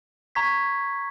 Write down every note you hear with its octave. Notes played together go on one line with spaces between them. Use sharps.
A#5 C#6 G#6 B6